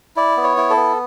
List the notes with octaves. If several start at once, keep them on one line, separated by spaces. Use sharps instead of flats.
E4 D5
B3
C#5
E4
A4
B3